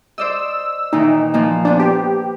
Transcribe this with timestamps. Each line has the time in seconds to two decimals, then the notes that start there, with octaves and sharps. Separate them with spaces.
0.18 C5 D5 D#5 E6
0.93 A#2 D#3 E3 D#4
1.34 A#2 F3 A#3
1.65 B3 D4 C5
1.79 G4